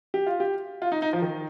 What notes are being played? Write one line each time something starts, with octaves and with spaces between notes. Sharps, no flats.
G4
F4
G4
F4
D#4
D#4
F3
D#3